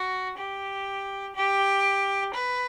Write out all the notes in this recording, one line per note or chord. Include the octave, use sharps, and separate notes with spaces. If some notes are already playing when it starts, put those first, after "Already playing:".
Already playing: F#4
G4
G4
B4